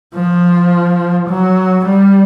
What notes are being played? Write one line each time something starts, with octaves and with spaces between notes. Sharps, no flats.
F3
F#3
G3